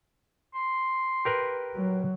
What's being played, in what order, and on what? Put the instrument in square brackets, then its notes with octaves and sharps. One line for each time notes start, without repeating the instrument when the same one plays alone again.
[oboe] C6
[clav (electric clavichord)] G4 A#4 B4
[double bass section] F#3